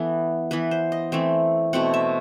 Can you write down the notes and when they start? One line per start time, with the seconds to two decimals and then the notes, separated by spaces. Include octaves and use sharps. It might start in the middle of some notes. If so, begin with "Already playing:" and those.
Already playing: E3 B3 A4
0.51 E3 B3 B4
0.71 C5
0.92 D#5
1.12 E3 A3 C4
1.73 B2 A3 C4 F#5
1.94 E5